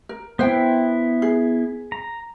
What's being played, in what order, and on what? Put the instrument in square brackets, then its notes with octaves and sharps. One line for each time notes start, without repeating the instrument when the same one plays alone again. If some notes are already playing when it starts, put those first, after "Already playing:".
[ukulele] A#4
[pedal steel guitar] B3 E4 [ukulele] C5 G5
[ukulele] G#4
[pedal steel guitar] A#5